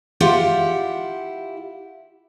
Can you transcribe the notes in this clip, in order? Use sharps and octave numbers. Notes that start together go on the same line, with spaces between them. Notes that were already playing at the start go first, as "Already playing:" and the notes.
E4 F4 G4 F#5